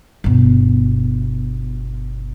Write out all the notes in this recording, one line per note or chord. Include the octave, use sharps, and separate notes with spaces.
G1 B2